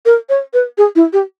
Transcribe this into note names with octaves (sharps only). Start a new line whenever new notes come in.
A#4
C#5
B4
G#4
E4
G4